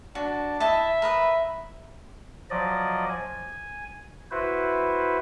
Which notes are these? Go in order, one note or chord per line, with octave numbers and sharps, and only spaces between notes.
D4 F#4
E4 D#5 E5 A5
A#4 B4 D#6
F3 F#3 D5 D#5
G#5
E4 F#4 B4 C5